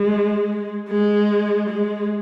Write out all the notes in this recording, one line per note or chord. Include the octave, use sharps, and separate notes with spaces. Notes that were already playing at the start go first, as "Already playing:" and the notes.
Already playing: G#3
G#3
G#3